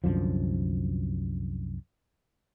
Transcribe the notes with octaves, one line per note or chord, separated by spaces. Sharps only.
C2 F#2 D3 F3